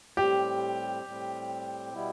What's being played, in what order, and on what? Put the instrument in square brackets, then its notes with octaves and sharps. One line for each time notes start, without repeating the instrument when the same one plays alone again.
[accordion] A2 G3 C4 [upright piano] G4
[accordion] A2 G3 C4
B2 G3 B3 E4